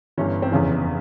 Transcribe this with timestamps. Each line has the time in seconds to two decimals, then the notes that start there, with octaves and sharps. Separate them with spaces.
0.18 G1 G2 E3 C#4
0.42 C4
0.51 F1 E2 C#3 E3 C#4